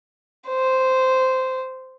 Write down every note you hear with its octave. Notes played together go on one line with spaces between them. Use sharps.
C5